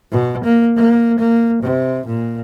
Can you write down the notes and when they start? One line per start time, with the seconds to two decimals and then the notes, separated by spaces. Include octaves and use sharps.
0.12 B2
0.44 A#3
0.77 A#3
1.19 A#3
1.63 C3
2.07 A#2